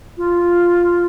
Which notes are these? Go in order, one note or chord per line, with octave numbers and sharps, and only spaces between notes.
F4